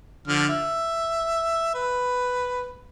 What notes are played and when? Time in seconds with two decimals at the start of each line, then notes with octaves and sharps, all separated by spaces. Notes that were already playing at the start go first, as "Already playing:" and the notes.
0.28 D3 F3 F6
0.49 E5
1.75 B4